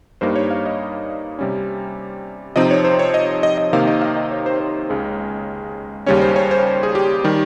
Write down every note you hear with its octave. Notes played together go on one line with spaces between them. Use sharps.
G2 G3 A#3 D#4 C5
C#5
F5
D#5
C3 G3 C#4
C3 F3 C4 D#4 D#5
C#5
C5
C#5
D#5
D#5
D#5
C3 D#3 A#3 D#4 F5
D#5
F5
D#5
C#5
C5
C5
C#2 C#3 G#3
D#2 C#3 G3 C#4 C#5
C5
C#5
C5
G#4
G4
D#3 G3